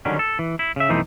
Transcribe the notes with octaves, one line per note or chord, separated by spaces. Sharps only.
D3 D#3 F#3 G3 C#4
A4
E3
E4
C#3 E5
B1 F2 E3 A3 D#4 C5